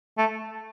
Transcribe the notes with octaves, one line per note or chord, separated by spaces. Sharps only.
A3